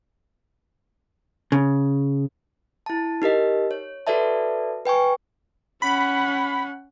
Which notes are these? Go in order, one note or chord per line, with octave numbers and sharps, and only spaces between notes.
C#3
E4 A5
D#4 G4 A#4 D#5
C#5
F#4 A4 B4 D5 E5 A5
B4 G5 G#5 C#6
C#4 F#5 B5